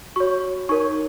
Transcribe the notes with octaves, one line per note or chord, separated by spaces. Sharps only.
F#4 C#5 C#6
D#4 A#4 C#5 C#6